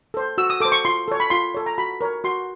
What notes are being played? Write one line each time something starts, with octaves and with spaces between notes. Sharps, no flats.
A4 C5
F#4 E6
D#6
A4 C5 D6
C#6
F4 C6
A4 C#5
B5
F4 C6
A4 C#5
A#5
F#4 B5
A#4 C#5
F#4 C6